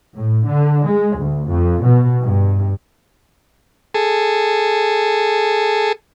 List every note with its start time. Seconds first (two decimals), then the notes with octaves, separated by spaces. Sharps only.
0.16 A2
0.48 D3
0.85 G#3
1.18 D2
1.48 F2
1.84 B2
2.24 G2
3.94 G#4 A4